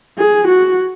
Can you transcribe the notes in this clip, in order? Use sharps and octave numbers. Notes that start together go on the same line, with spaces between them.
G#4
F#4